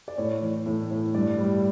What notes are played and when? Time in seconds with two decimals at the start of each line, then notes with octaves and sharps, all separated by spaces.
0.08 D5
0.18 A2 C#5
0.42 E3
0.66 A2
0.91 A2
1.14 G2 D5
1.38 G3